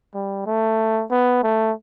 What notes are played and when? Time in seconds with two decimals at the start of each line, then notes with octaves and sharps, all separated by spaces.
0.14 G3
0.46 A3
1.11 B3
1.43 A3